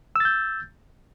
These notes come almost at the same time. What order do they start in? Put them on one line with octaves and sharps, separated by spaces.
E6 A6 G6